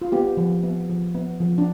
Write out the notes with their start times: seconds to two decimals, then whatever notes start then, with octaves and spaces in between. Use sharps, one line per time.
0.01 F4
0.12 B3 G4
0.37 F3
0.63 B3
0.89 F3
1.14 B3
1.40 F3
1.58 D4